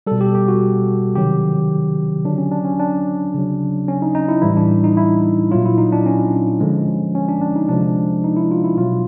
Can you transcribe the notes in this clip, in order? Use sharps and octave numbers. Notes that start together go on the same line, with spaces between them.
B2 G3 A4
G4
G4
F#4
C3 D#3 F#3 G4
D3 F#3 D4
C#4
D4
C#4
D4
C#3 F#3
C#4
D#4
D#4
E4
A2 E3 G3 E4
D4
D#4
E4
A#2 F#3 F4
E4
D#4
D4
C#4
D3 F3 G#3
C#4
D4
D4
D#4
C3 F3 G#3 D4
D#4
E4
F4
E4
B2 F#3 F4